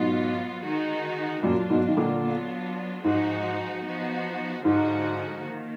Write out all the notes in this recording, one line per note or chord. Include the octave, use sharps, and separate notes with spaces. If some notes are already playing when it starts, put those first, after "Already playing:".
Already playing: G#2 B2 F#3 B3 F4
D#3 G#3 D#4 F#4
F#2 A#2 F#3 A#3 D4 F4
G#2 B2
D#3
A#2 D3
F#3 B3 D4 F4
G#2 F3 G#3 D#4 F#4
F3 B3 D#4 F#4
G#2 D3 F3 G#3 D#4 F#4
D#3 A#3